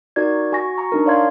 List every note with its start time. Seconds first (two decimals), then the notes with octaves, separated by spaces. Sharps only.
0.16 D#4 F#4 A#4 D5 G#6
0.52 F#4 G#5 C#6 A#6
0.78 A#5 C#6
0.92 D4 D#4 A#4
1.06 C#5 D5 F5 C6 G#6